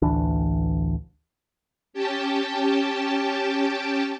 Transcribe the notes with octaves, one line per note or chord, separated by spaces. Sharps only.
A1 D2 E3 D4
C#4 G4 G5 A5